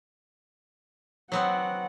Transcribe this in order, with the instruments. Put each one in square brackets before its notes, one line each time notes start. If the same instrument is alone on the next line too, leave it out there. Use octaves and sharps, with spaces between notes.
[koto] F#3 B3 C4 [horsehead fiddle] F#5